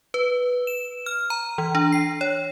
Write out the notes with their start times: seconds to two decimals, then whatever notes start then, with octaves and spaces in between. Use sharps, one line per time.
0.14 B4
0.67 E7
1.06 F6
1.30 A#5
1.58 E3
1.75 D4
1.92 C7
2.21 C#5